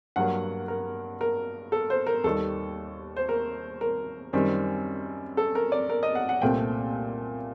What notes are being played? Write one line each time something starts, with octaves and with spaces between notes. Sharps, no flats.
G2 F#3 A#3 F#5
A#4
A#4
A4
C5
A#4
D#2 D#3 G3 A4
C5
A#4
A#4
F#2 D#3 G3 C4
A4
A#4
D5
A#4
D#5
F#5
F#5
C2 A#2 A3 C4 G5